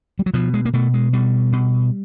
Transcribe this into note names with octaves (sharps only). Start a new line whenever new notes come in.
G3
F#3
B2 F3
G#3
A#3
B2 A3
G#3
B2 G3
B2